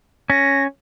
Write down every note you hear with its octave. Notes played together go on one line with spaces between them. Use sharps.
C#4 A#6